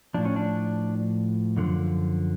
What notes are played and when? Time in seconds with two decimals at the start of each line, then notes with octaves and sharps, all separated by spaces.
0.14 A2 F3 D4
0.25 C#4
0.36 D4
1.57 F#2 D3 F3